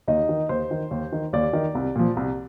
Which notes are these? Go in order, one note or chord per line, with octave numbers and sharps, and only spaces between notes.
D#2 D#4 D#5
D#3
D#2 C5
D#3
D#2
D#3
D#2 D5
D#3
C2
A#2 F3
C2